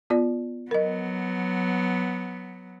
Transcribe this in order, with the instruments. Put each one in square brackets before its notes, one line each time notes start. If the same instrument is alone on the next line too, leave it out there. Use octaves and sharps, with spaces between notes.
[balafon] B3 F4 D5
[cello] F#3 B3 [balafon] A#4 D#5